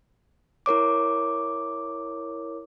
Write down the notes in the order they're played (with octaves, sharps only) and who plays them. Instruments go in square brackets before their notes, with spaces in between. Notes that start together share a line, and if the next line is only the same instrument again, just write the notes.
[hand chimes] E4 A#4 C#5 D6